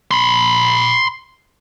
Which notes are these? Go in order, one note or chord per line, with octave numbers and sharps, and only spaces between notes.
B5 C6